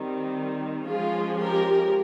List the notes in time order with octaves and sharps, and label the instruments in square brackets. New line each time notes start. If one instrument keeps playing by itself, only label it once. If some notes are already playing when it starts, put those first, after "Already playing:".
Already playing: [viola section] D#3 G3 C4
F3 G#3 C#4 F4 G#4
G4 A#4